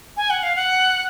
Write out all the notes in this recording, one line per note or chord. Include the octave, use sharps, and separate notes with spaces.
G#5
F#5
F5
F#5